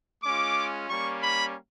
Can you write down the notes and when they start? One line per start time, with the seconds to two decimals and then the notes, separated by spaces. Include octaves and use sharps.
0.23 G#3 C#4 F4 D6
0.89 G3 A#3 C#4 C#6
1.23 B5